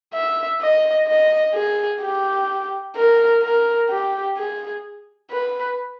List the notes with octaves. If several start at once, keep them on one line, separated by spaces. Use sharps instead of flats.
E5
D#5
D#5
G#4
G4
A#4
A#4
G4
G#4
B4